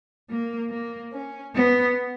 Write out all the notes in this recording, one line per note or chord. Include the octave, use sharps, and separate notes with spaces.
A#3
A#3
C#4
B3